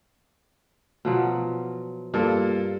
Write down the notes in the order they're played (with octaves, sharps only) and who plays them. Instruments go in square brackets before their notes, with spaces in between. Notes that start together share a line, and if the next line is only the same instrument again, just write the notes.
[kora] B2 F3 F#3
[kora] G2 [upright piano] A#3 F4 A4